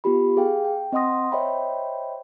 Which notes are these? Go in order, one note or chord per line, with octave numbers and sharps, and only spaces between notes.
B3 F4 G4 B5
G#4 F5 G5
G5
C4 D#5 F#5 C6 D#6 A#6
C5 C#5 D#5 E5 G5 B5